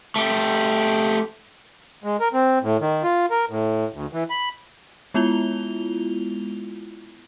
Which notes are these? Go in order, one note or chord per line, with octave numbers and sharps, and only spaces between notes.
A3 G4
G#3
A#4
C4
A2
D#3
F4
A#4
A2
D2
E3
B5
G#3 B3 E4 F4 F7 G7